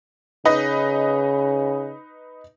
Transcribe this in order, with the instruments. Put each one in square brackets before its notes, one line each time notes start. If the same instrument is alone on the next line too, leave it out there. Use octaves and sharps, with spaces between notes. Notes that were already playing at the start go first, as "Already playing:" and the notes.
[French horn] C#3 [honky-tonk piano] D#4 B4 D#5